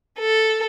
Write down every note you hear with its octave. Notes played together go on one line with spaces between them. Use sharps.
A4